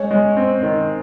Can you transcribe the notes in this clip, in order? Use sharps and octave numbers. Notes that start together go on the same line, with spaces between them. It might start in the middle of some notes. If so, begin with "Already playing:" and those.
Already playing: G#3 C#5
G#3
C4
D#3